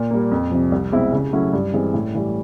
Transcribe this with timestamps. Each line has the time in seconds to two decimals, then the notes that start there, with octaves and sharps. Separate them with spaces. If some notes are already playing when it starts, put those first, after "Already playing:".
Already playing: A#2
0.11 G3 A#3
0.31 F2
0.51 C3 F3
0.72 C2
0.92 B2 G#3 C4 E4
1.13 C#3
1.33 F#3 A3 C#4 E4
1.53 G2
1.74 E3 G#3 C4
1.94 A2
2.15 E3 G3